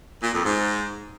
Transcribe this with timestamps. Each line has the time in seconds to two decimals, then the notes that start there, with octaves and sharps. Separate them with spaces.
0.22 A#2
0.33 F2
0.44 G#2